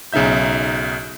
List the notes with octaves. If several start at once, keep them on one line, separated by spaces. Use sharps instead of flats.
B1 C#3 D#4 E5 G6